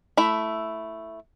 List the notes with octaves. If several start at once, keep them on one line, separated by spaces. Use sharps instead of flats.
A3 E4 E5